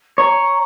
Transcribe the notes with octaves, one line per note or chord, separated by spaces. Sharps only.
C#5 A#5